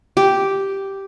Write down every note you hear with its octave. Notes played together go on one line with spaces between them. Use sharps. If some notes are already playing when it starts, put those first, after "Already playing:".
G4